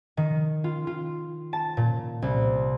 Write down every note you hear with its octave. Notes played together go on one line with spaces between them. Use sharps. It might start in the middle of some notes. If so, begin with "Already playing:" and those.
D#3
F4
F4
A5
A#2
C2